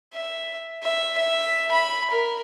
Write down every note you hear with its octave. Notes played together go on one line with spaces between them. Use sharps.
E5
E5
E5
B5
A#4